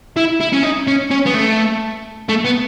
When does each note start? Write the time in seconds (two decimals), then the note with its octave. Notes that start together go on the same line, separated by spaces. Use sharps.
0.17 E4
0.40 E4
0.52 C#4
0.63 D#4
0.87 C#4
1.11 C#4
1.26 B3
1.34 A3
2.29 A3
2.45 B3